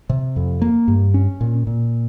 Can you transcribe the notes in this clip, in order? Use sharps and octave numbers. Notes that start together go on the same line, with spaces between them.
C3
F2
A#3
G2
C#4
A#2
A#2